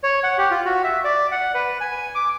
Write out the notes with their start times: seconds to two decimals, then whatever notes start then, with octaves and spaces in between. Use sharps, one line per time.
0.03 C#5
0.24 F#5
0.38 G4
0.51 F4
0.65 F#4
0.84 E5
1.04 D5
1.31 F#5
1.54 B4
1.81 G#5
2.15 D6